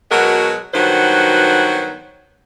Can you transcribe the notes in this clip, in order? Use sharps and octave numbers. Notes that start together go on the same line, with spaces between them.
B2 F#3 G#3 B3 F#4 A#4
G2 D#3 F#3 B3 F#4 C5